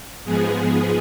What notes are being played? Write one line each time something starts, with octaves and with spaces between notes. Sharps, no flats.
G#2 F3 G#3 B3 G#4
G#4